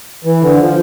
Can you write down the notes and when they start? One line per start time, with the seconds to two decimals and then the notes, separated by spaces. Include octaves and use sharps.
0.25 E3
0.41 D3
0.58 F3